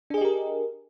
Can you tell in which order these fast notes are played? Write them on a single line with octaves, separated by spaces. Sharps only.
D4 G#4 D#5 G4 A#4